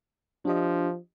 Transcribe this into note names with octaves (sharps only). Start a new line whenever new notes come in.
F3 D4 G4 D#5